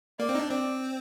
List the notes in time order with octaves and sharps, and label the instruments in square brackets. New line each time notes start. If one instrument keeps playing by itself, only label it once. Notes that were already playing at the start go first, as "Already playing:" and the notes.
[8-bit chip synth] A#3 [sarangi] D5
[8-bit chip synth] C4
D#4
D4
[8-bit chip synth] C4 [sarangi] D5